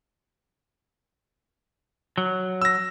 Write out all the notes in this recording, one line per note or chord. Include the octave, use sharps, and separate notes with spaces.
F#3
E6 A#6